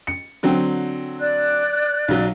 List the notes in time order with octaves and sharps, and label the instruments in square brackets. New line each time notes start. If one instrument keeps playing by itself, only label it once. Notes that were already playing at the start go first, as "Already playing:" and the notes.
[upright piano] C#7
D3 F#3 C4
[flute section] D5 F#6
[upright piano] B1 F#3